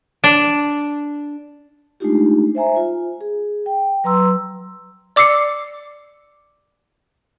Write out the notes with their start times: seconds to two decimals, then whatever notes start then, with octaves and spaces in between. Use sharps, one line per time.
0.24 D4
2.00 G#3 A3 D4 D#4 F4 G4
2.55 C5 E5 G#5 A#5
2.76 F4
3.21 G#4
3.66 G5
4.04 F#3 B4 A#5 C6 E6
5.16 D5 D6 E6 C7 C#7